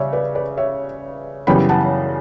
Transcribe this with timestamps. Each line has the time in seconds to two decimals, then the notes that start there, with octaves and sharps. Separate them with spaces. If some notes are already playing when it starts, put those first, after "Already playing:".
Already playing: C#3 G3 C#5 D5 E5
0.13 B4 D5
0.35 B4 D5
0.57 C#5 E5
1.47 F#2 C#3 E3 G3 B3 G5 B5
1.69 F#5 A5